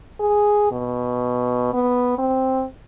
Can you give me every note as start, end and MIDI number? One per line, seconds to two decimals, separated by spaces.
0.20 0.67 68
0.71 1.69 47
1.73 2.15 59
2.18 2.64 60